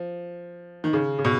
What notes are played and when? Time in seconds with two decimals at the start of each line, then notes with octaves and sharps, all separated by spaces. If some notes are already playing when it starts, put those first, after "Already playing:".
Already playing: F3
0.84 D#3
0.93 C#3
1.19 C#3
1.25 B2